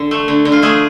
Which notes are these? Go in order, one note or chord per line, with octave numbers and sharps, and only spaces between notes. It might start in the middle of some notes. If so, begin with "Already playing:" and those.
Already playing: D3 A4
A3
D3
D3
F4
A3 G#4